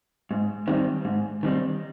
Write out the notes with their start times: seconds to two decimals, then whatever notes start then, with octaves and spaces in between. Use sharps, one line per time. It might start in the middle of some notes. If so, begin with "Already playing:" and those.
0.31 G#2
0.67 D#3 G3 C4 D#4
1.05 G#2
1.43 D#3 G3 C4 D#4